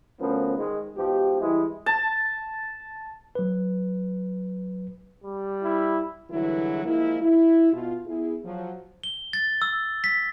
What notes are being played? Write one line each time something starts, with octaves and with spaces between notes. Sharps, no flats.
D2 F3 B3 C#4 A#4
G#2 D#3 G#3
G#2 B2 F3 G4
E3 G3 G#3 E4
A5
F#3 B4
G3
E4
G2 D3 E3 F#3 G#3 E4
F3 G#3 A#3 E4
E4
B2 F4
B3 E4 G#4
F3 F#3
G7
A6
E6
B6